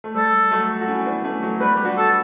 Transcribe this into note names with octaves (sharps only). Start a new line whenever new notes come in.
A3
G3 A4
F#3 A3
F#4
C#4 E4
B3 D4
A3 C#4
F#3 A3
G3 B3 B4
G4
D4 F#4
A4